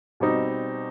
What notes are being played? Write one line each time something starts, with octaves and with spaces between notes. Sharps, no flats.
B2 G3 C4 D#4